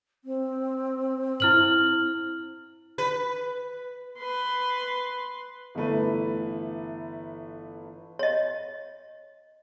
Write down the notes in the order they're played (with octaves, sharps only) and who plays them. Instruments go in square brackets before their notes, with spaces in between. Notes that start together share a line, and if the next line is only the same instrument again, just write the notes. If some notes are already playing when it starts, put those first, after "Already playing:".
[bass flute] C4
[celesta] E4 F6 F#7
[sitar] B4
[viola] B4 C6
[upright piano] G1 E3 A3 B4
[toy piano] C#5 D#5